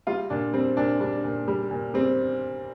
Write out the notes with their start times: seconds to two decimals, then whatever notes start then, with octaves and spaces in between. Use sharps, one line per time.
0.07 G3 F4
0.30 A#2 D4
0.53 G3 C4
0.77 A#2 D4
1.00 G3 D4
1.24 A#2
1.48 G3
1.71 A#2
1.94 G3 C4